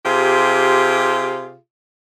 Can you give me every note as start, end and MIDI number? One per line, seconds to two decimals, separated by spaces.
0.03 1.55 48
0.03 1.55 65
0.03 1.55 67
0.03 1.55 68